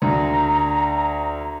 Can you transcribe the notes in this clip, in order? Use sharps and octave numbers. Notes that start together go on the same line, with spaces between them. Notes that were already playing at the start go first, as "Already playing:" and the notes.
D2 A#5